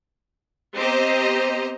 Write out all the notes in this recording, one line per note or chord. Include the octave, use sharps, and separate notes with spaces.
B3 C4 G4 C5 D#5 A#5